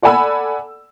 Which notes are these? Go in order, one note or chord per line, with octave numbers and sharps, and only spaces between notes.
A4 D5 F#5 G#5 B5 E6